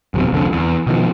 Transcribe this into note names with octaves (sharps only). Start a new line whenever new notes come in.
D1 B1 E2 C3
C2 F2 D3
E2
B2 D#3 F3